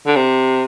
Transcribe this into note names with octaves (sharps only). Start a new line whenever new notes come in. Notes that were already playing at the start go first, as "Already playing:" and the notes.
D3
C3